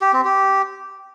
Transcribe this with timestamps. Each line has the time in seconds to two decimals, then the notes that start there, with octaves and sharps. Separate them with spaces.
0.01 G4
0.13 C4
0.25 G4